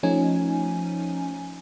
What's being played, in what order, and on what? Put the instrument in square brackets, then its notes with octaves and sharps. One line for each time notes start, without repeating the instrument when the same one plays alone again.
[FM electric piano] F3 A3 C#4 D#4 G#5